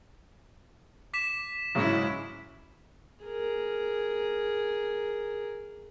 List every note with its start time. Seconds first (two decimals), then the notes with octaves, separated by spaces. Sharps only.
1.14 D6 B6 E7
1.75 G#2 C#3 F#3 G#3 E4
3.26 G#4 A#4